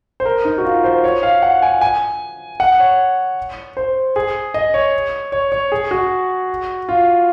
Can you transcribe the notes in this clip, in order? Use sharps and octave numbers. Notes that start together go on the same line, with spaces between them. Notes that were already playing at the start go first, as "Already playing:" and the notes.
C5
A#4
D#4
F#4
F4
C5
C#5
F5
F#5
G#5
G#5
F#5
C#5
C5
G#4
D#5
C#5
C#5
C#5
G#4
F#4
F4